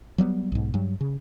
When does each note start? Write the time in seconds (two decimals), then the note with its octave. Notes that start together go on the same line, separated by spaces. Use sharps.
0.18 F#3 G3 A3 B3
0.52 B1 G#2
0.74 G2 F#3
1.01 C#3